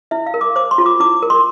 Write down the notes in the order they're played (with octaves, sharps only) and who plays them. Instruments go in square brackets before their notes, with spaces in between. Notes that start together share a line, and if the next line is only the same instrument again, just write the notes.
[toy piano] E4 E5
F5
A#4
D6
C5 D6
C6
F4
D6
E4 D6
A#4
C6